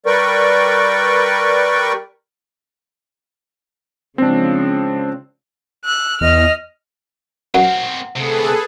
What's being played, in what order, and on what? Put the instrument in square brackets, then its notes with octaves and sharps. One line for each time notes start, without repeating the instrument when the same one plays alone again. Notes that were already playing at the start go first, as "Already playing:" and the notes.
[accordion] G3 A#4 B4 D5 G5 C#6
[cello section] C#3 F3 G#3 [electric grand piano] C4 D4
[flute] E6 [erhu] F#6
[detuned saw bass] E2 [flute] D#5 [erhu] F6
[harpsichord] F#2 [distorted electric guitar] C4 A#4 [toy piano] F#5
[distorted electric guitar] D2 C3 [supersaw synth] G#4 A4 B4